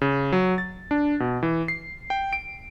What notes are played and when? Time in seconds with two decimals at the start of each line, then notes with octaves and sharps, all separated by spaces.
0.01 C#3
0.32 F#3
0.58 A6
0.91 D4
1.20 B2
1.43 E3
1.68 C7
2.10 G5
2.33 D7